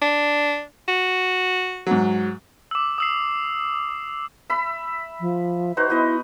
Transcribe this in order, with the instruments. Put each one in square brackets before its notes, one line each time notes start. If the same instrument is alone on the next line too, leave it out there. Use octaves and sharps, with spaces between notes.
[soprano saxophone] D4
F#4
[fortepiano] G#2 F#3
[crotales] D6 E6
D#6 E6 C7
[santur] E5 B5
[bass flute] F3
[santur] D#4 F#4 C5 [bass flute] B4
[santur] B3 D#5 [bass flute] E4